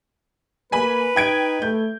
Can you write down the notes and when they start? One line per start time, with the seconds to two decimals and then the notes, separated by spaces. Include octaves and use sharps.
0.72 A#3 B4 G#5 B5
1.16 D#4 G5 G#6 D7
1.62 A3 G6